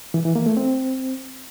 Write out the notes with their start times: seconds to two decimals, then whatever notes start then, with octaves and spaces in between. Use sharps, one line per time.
0.14 E3
0.25 E3
0.36 A#3
0.46 A3
0.57 C4